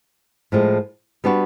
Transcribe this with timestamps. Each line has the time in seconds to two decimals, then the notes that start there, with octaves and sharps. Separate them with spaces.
0.52 A2 F3 G#3
1.24 G3 B3 D4 F#4 B4